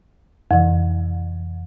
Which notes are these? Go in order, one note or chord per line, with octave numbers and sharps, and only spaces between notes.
F2 C3 E3